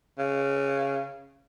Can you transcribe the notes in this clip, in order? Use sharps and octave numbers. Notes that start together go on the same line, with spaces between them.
C#3